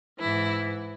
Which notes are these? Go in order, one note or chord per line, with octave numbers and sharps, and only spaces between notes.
G#2 E3 E4